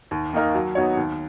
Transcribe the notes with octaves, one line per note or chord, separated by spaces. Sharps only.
D#2
D#3 A#3 D#4 A#4
F#3
B3 D#4 F#4 C#5
D#2